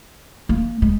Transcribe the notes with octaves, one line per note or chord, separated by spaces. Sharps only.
A#3
G#3